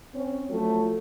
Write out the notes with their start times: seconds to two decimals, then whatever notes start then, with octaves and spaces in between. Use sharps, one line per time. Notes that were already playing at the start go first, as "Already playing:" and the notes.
0.14 C4 C#4
0.49 F3 F#3 A3